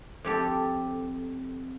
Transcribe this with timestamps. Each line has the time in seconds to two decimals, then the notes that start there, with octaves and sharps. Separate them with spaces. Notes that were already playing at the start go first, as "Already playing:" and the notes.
0.24 F2 G4 A4